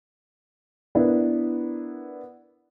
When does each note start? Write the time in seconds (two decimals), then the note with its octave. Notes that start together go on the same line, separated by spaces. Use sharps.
0.95 B3 D4 E4 A#4 B4 D5